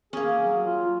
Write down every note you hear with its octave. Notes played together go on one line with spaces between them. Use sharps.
A#3 C#4 G#4
F#3
F4